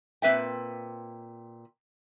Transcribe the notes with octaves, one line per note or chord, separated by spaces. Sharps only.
A#2 C4 B4 E5 G5